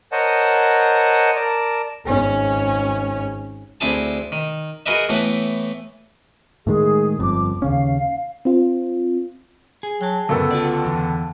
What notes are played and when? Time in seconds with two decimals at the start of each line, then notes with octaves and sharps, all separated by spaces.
0.12 A#4 C5 C#5 D#5 F#5 A5
1.35 A#4 D5 A5
2.06 G#1 C#4
3.81 D2 C4 E4 G#4 A5
4.32 D#3
4.86 F#4 G#4 A#4 B4 D#5 E5
5.09 A2 E3 A3 B3
6.67 A2 D#3 G#3 G#4
7.19 G1 F2 D6
7.62 D#2 C#3 C#4 F5
8.45 C4 F4
9.83 G#4
10.01 F#3 G5 A5
10.29 C#2 F#2 D3 B3 A4
10.51 F4 F#4 D5
10.85 E2